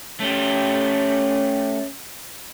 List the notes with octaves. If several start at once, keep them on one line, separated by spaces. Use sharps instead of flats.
A3 C#4 G4